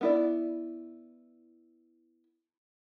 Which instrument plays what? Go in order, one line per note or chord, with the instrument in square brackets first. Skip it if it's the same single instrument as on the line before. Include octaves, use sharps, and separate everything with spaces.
[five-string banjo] B3 E4 D5